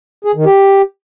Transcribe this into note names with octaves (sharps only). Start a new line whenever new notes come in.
G#4
D#3
G4